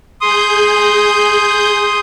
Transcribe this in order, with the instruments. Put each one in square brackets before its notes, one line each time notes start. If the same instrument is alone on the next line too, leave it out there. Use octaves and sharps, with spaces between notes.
[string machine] G#4 G6 [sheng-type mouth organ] C6 D#6